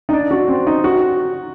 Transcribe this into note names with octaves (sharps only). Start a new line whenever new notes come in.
D#4
D4
F#4
C4
D#4
F#4